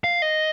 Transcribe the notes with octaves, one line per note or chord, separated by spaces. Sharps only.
F5
D#5